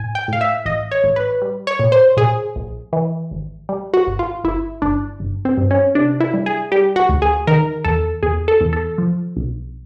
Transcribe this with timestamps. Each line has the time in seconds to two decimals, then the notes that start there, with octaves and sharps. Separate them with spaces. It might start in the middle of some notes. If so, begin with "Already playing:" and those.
Already playing: A2 G#5
0.15 G5
0.28 A2 F5
0.41 E5
0.65 A1 D#5
0.91 C#5
1.04 A1
1.16 B4
1.42 G3
1.67 C#5
1.79 A#2
1.92 C5
2.17 A#2 G#4
2.56 A#1
2.93 E3
3.31 G#1
3.69 G3
3.94 F#4
4.07 G#1
4.19 F4
4.44 G1 E4
4.82 G1 D4
5.20 G1
5.45 C4
5.57 G2
5.71 C#4
5.95 C3 D4
6.21 E4
6.34 G3
6.46 G#4
6.72 G3 G4
6.96 F#4
7.09 D2
7.22 G#4
7.47 D#3 A#4
7.84 E2 A4
8.23 E2 G#4
8.48 A4
8.61 E2
8.73 A4
8.98 F3
9.37 B1